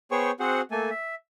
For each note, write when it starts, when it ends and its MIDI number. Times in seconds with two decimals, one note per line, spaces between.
0.11 0.31 59
0.11 0.31 68
0.11 0.31 72
0.11 0.31 73
0.11 0.31 79
0.11 0.31 85
0.40 0.61 60
0.40 0.61 66
0.40 0.61 68
0.40 0.61 72
0.40 0.61 78
0.71 0.90 57
0.71 0.90 58
0.71 0.90 69
0.71 0.90 80
0.90 1.15 76